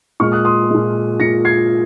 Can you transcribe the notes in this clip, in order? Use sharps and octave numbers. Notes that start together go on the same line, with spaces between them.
A#2 G#3 C#6 F6
D#6 F#6
C6 D#6
A#2 G#3
A#2 G#3 A#6 C#7
G#6 C7